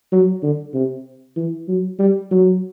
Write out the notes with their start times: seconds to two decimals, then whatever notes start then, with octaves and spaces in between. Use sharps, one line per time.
0.12 F#3
0.43 D3
0.74 C3
1.36 E3
1.68 F#3
1.99 G3
2.31 F#3